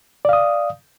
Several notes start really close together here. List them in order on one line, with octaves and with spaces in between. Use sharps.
D5 F5 D#6